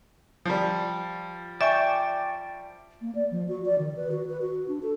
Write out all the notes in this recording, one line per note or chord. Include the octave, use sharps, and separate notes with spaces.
F3 G3
D5 E5 G5 G#5 C#6
A#3
D5
F3
F#4
D5
D#3
B4
F#4
B4
F#4
D4
A4